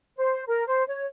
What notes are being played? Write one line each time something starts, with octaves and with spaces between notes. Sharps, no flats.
C5
A#4
C5
C#5